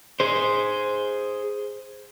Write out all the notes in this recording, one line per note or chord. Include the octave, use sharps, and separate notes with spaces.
G#4 C5